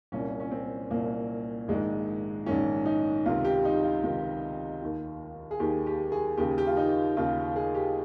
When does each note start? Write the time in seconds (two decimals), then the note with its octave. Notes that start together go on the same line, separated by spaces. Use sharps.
0.12 C2 A#2 C#4
0.40 C#4
0.51 C4
0.90 C2 A#2 A#3
1.68 A#1 G#2 D#3 G#3
2.46 A#1 G#2 D#3 C#4
2.86 D#4
3.26 C#2 C3 D#3 F4
3.45 G4
3.65 D#4
3.83 F4
4.03 C#2 C3 D#3
4.82 D#2 D#3
5.51 G#4
5.60 D#2 D#3 G4
5.87 G4
6.12 G#4
6.37 D#2 C#3 G4
6.58 G4
6.67 F4
6.77 D#4
7.17 D#2 C#3 F4
7.56 G#4
7.75 G4